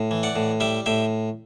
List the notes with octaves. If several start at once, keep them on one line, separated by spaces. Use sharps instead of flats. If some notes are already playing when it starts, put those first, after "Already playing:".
Already playing: A2
E3
D5 F#5
A2
G3 E5 G5
A2 E5 G5